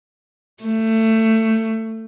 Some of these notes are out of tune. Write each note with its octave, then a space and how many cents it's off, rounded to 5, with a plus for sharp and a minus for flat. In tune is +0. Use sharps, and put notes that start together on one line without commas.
A3 +20